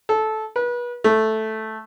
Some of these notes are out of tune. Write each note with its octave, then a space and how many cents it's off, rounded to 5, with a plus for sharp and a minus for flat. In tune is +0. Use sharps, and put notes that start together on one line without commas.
A4 -15
B4 -30
A3 -5